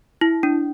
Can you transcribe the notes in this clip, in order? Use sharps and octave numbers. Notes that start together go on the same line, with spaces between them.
E4
D4